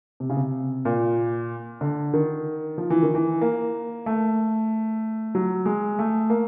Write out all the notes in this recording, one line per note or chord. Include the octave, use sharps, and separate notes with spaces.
C3
C#3
C3
A#2
D3
D#3
F3
E3
D#3
E3
A#3
A3
F#3
G#3
A3
A#3